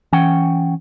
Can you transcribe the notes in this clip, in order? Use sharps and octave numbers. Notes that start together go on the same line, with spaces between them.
E3 C#4 F#5 G5